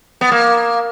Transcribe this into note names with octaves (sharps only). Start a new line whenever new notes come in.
B3
A#3